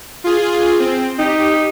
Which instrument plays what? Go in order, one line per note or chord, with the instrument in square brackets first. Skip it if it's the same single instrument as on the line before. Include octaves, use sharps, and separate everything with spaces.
[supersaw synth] F4 G#4
C4
[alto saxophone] D#4 [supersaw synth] G4